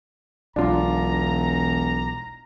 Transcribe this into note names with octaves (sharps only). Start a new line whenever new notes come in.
E1 B1 D4 F4 A#5